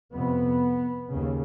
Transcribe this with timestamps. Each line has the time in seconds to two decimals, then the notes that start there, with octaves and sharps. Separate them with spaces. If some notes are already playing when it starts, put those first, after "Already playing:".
0.14 F2 C3 B3
1.11 D#2 C#3